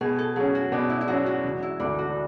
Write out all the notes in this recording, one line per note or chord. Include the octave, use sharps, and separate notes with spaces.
B2 G#4
A4
F#3 C#4 G#4
F#4
B2 D4
E4
E4
F#3 C#4 F#4
F#4
E1
E4
D2 D3 A3 D4
F#4